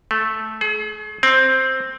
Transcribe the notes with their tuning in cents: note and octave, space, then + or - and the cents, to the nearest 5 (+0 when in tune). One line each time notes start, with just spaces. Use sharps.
A3 -10
G#4 +40
C4 +5